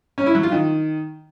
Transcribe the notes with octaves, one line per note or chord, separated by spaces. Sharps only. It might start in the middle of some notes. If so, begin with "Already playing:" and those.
C#4
E4
F#3
F4
D#3